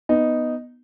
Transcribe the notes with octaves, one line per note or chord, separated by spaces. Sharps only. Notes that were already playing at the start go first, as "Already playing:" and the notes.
B3 D#4